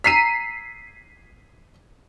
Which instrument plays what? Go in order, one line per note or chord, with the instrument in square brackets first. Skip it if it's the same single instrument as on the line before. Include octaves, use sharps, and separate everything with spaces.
[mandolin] A#5 E6 [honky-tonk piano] B6 C7 D#7